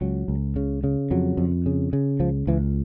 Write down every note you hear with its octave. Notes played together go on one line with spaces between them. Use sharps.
C#2 F#3
C#2
C#3
C#3
F2 F#3
F2
C#3
C#3
C#2 F3
C#2 E3